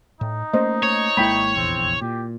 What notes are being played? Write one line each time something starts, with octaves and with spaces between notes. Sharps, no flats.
A2 D#4
A3 A#3 C#4 C5 D#5
C#5
G#1 G#3 A#3 E4 G5 B5
F1 A#1 E2 C4
A#2 G4